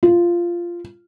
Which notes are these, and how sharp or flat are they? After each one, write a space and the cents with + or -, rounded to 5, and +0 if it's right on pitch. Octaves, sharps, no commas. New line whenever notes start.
F4 -10